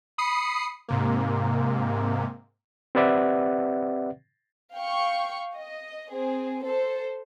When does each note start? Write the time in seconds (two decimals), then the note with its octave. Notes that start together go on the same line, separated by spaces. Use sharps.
0.18 B5 D#6 C7 C#7
0.88 G#2 C3 A#3
2.95 C4 G4 B4 D5 E5 F#5
4.75 F5 G5 C#6
5.56 D#5
6.10 C4 G#4
6.63 A4 C5